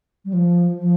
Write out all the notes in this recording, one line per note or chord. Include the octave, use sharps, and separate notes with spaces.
G3
F3
F3